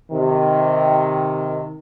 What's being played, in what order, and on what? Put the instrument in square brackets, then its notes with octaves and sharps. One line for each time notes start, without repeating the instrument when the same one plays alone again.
[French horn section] C3 D#3